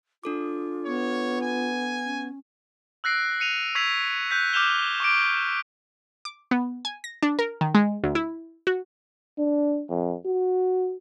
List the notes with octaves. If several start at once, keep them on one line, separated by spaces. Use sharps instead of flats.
D4 F4 A4 D6
B3 C#5
G#5
C#4
E6 F#6 A#6 C7 D7
C#7 D#7 F7
C#6 E6 G#6 B6 C7 F7
F#6 G6 B6
D6 F6 G6 E7 F7 G7
C#6 D6 D7
D6
B3
G#5
A#6
D4
A#4
D#3
G#3
D2
E4
F#4
D4
F2
F#4